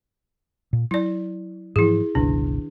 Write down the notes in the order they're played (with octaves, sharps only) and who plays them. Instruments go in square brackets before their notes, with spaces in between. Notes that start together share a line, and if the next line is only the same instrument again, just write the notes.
[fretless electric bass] A#2
[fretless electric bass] F#3 [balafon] E4 D5
[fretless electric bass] G#2 E3 F3 [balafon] E4 G#4
[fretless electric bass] G1 C#2 B2 [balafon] D#3 D4